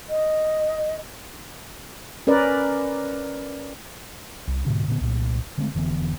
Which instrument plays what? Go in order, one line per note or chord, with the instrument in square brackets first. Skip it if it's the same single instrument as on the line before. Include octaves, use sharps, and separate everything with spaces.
[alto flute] D#5
[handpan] C#4 A#4 B4 D5
[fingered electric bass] C2
G#2 B2 D3 D4
A#2 D3 B3
C2 A#2
D3 G#3 A3 C4
F1 D3 E3 B3